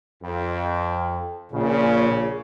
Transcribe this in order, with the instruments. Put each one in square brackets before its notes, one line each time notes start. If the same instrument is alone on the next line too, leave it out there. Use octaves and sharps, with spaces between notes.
[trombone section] F2
[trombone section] A#1 C#3 [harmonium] A#2